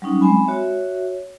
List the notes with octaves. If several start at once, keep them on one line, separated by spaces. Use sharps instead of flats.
F#3 G3 C#4 D#4
G#3 C4 G#5 B5
F#4 C#5 E5